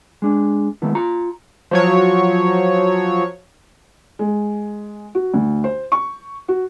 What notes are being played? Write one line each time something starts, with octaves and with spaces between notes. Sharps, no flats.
G#3 D4
D#3 G#3 A3 B3 E4
F4 A#5
F3 F#3 C#5
G#3
F#4
D2
C5
C#6
F#4